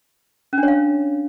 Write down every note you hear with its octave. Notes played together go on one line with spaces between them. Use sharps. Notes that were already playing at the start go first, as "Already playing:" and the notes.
C#4
D4
C#5
F5